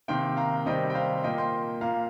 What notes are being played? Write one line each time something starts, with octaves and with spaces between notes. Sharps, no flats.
C3 D#3 A#3 G5 C6
F5 A#5
C3 D#3 G3 C4 D#5 G5
G5
C5 F5
A#2 A#3 D#5 G5
G5 C6
A#2 A#3 F5 A#5